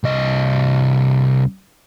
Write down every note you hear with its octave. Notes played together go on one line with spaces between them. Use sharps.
C2 D#5